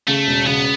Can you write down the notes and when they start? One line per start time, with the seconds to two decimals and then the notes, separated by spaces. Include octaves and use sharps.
0.08 C#3 A3
0.27 E1
0.46 C#3 B3